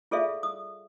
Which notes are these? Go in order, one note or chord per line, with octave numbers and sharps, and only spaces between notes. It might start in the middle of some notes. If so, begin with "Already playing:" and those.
F4 G#4 A4 D5 E5 F5
D#6